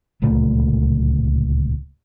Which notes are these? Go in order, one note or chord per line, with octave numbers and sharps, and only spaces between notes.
D1 C#2 A#2 A3